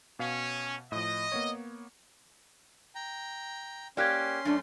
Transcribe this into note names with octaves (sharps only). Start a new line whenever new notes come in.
B2 C#4 F5
A2 F3 D#5
A#3 B3 C#5
G5 A#5
A#3 C#4 G4 D5 C6 F#6 G#6
F#2 A3 D4